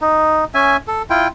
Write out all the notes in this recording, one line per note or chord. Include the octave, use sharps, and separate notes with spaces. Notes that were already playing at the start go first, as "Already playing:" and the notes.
D#4
C#4 E5 G#5
A4
E4 F4 G5